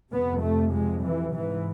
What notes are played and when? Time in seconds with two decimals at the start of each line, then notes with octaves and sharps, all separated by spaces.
0.12 F2 C3 B3
0.42 A3
0.73 G#3
1.04 E3
1.35 G#2 E3